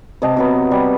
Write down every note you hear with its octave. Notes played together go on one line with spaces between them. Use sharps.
C3 D#5 A5
C3 F#3 B3
G3